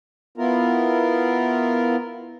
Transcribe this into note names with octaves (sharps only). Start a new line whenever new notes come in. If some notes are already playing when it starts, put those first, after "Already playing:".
B3 E4 F4 A#4